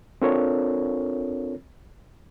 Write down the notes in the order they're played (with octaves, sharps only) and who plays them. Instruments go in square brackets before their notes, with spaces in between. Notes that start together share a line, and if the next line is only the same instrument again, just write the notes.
[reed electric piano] C4 D4 F4 A4 A#4 C#5